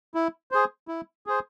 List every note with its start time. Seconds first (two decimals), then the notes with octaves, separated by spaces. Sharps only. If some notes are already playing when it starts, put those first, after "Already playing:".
0.15 E4
0.51 G#4 C5
0.88 E4
1.26 G#4 C5